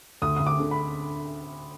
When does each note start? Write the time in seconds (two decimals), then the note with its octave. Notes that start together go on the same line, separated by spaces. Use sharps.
0.22 D2 D#6
0.36 D2 D#6
0.47 D6
0.59 D3
0.71 B5